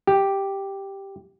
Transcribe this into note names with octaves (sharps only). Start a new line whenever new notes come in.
G4